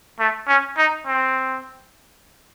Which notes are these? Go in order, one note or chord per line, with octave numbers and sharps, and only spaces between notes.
A3
C#4
D#4
C4